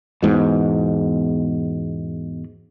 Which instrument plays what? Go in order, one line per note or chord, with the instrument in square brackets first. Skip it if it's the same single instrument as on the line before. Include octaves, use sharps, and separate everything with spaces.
[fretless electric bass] E2 G#2 B2